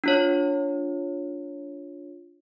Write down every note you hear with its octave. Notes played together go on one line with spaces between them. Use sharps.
D4 F4 C#5